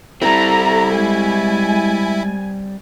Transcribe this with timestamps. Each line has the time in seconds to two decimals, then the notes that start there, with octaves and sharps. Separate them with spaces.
0.22 G3 C4 E4 A4 A#5
0.92 G#3 G#5